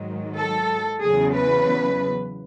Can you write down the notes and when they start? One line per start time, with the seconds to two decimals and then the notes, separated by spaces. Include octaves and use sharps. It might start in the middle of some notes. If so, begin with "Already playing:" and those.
Already playing: G#2 D#3 F#3
0.38 A4
1.02 E2 C#3 F#3 G#4
1.35 B4